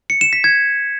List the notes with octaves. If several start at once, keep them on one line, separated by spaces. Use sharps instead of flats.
C#7
E7
B6
G#6